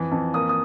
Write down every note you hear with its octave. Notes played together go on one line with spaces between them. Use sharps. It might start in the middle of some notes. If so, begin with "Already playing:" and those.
Already playing: F2 E3
F2
A#3 D#6
D#6